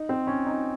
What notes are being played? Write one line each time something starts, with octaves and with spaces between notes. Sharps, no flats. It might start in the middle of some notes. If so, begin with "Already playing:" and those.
Already playing: D#4
C4
C#4
D#4